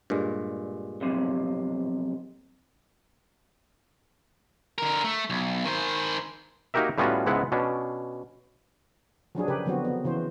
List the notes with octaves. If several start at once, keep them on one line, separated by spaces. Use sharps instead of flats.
G2 A#2 G#3
B1 F2 C3
D3 A#4
A3
B1
D#3 C5
A#3 D#4 F#4 G4 A#4 E5
A2 G3 B3 C#4 F4 F#4
C#2 G#2 G#3 B3 E4 F#5
B2 C#4 D4
F3 F#3 D4 G#4
C#3 G4 A#4 B4
D3 F3 F#3 B3 C4 F#4
B3
C#3 E3 F#4 C5